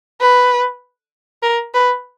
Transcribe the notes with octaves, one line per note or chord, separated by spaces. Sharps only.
B4
A#4
B4